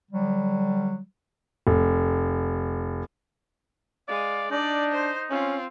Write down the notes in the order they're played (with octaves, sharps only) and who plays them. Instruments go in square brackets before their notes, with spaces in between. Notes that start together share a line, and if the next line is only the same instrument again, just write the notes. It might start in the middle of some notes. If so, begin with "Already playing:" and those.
[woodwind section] D3 F#3 G3
[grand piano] F1
[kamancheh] G#3 F5 [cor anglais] D5
[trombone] D4 [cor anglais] D#4 [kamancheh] D5
[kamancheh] C5
[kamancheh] C4 F4 [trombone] C#4